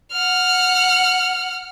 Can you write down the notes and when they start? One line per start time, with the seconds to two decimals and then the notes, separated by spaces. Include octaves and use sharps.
0.12 F#5 F6